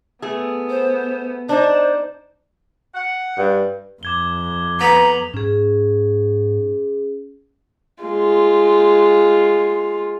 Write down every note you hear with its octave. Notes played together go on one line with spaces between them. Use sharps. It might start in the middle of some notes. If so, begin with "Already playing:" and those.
A3 B3 G#4
C5
D4 D#4 C5 A5
F#5
G2
F2 D6 G#6 G7
B3 A#5 F7 F#7
G#2 C#4 G#4
G#3 F4